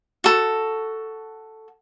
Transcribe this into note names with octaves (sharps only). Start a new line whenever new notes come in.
F#4 A4